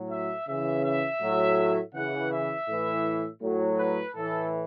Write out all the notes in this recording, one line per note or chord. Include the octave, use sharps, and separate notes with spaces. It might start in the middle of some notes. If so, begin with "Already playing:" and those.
Already playing: A2 F#3
E5
C#3 E3 E5
E5
A2 F#3
C#3 E3 F#5
E5
A2 E3
A2 F#3
B4
A2 E3 A4